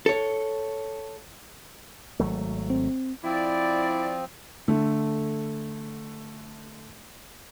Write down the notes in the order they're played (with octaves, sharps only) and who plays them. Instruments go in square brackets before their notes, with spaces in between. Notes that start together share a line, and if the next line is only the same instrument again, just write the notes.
[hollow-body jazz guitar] A4 C#5
[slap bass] G#1 F#3 A3
[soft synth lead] C4
[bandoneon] F3 C4 [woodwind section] E4 D5
[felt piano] D3 A3